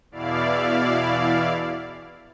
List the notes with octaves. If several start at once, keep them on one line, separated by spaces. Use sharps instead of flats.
E2 B2 E4 D5 F5